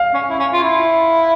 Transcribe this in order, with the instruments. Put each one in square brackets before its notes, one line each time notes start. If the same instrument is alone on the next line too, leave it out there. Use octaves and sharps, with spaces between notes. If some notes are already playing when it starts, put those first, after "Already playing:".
Already playing: [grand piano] F5
[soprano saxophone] C#4
E4
C#4
F4
E4